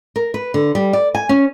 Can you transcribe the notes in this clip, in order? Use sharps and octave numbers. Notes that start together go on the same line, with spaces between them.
A#4
B4
D3
G3
D5
G#5
C#4